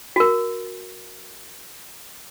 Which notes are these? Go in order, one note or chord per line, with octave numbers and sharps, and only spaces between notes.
F#4 A#4